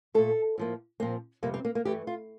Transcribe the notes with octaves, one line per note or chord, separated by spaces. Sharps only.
A#2 A3 A4
A2 F3 A#3
A#2 F3 A#3 C4
F2 C3 G3 A#3
C4
A#3
A#3
G2 E3 A3 G4
F4